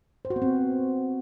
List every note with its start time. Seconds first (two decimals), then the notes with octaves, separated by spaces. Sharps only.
0.25 C5
0.30 F#4
0.36 B3
0.42 C4